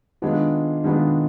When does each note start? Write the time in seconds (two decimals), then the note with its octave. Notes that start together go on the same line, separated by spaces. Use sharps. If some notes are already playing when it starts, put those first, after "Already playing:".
0.22 D#3 G#3 B3 D4 F4
0.84 D#3 G#3 B3 D4 F4